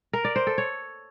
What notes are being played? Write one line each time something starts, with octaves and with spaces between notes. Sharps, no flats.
A#4
D5
C5
A4
C#5